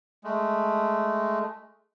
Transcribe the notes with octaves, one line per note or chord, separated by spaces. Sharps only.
G#3 A3